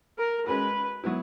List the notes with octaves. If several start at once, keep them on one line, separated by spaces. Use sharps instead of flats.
A#4
G#3 C#4 F#4 B4
F#3 B3 E4